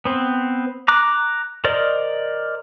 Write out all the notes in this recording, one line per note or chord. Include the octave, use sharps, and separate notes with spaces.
B3 C4
A#5 D6 F#6
A#4 C5 D5 D#5